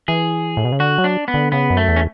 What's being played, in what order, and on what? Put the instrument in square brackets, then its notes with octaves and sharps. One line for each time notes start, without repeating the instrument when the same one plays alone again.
[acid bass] E3 [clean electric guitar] G#4
[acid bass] A2
B2
C#3
[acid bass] D3 [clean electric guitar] F#4
[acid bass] F#3
[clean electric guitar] D4
B3
[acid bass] D3
[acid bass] C#3 [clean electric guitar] B3
[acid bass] F#2
[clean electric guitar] A3
[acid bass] E2
[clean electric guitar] C#4